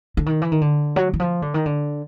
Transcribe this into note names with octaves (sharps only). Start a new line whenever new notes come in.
D3
D#3
E3
D#3
D3
F#3
E3
F3
D3
D#3
D3